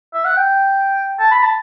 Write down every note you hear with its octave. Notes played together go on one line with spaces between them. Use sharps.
E5
F#5
G5
A5
B5
A5